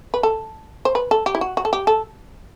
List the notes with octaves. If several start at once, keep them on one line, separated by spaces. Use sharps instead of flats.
B4
A4
C5
B4
A4
G4
E4
F#4
F#4
A4
G4
A4